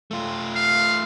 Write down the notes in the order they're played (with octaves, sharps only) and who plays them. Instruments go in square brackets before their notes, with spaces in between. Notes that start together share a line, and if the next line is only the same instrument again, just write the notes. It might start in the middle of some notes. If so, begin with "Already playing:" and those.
[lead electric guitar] A3 F4
[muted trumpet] F5